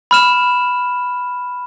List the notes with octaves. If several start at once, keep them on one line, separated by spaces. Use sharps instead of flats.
B5 F6 E7